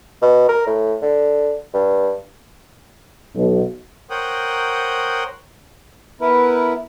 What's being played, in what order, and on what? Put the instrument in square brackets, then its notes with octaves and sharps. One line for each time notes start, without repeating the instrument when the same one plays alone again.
[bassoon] B2
A#4
A2
D3
G2
[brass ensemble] B1
[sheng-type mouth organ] A#4 C5 C#5 F#5 G5 D#6
[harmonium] B3 E4 A#4 B4